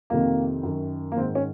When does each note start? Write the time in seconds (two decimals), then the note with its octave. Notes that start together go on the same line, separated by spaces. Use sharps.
0.10 F2 C3 D#3 A#3
0.63 F#2 D#3
1.12 A#3
1.16 D#3 C4
1.20 G#2
1.35 C#4